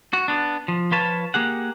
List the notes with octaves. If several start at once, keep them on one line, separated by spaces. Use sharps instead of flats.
F#4
B3 D4
F3
F3 F4 B4 C#5 A5
A#3 G4 G#4 F#5